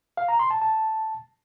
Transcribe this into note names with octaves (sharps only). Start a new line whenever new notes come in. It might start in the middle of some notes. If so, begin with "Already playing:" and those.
F5
A#5
C6
A5
A5